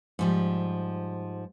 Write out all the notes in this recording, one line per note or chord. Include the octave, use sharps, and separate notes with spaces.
G#2 F3 G3